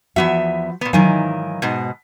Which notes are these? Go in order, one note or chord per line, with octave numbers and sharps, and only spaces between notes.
E2 F3 B3 F#4 E5
A#2 B3
G#2 D#3 E3 F#3 F5 G#5
G#2 B2